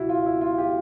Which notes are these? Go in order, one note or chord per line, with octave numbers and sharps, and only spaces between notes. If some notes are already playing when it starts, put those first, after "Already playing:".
Already playing: C#2 B2 F#3 E4 F#4
F4
E4
F4
F4 G4